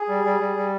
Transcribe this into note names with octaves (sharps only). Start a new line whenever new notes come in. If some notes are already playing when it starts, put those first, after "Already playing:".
Already playing: G#4
G3
G3
G3
G3